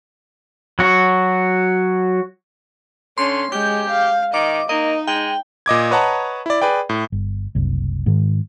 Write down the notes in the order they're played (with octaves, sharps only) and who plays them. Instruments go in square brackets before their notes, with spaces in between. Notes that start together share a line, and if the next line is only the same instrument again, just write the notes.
[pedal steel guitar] F#3 F#4
[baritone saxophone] D3 [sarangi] C#4 [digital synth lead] C6
[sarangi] G#3 [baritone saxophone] G4 [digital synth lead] G6
[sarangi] F5
[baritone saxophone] D#3 [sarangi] D#5 [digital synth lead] D6
[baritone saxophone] A#3 [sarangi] D#4 [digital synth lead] D#5
[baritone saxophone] G#3 [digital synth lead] G5
[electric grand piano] A#2 D#5 D6 G#6
B4 C#5 D#5 F#5 A5 A#5
E4 D5
G#4 B4 D5 G5
A2
[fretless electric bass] G1
F#1 C2
G#2 D#3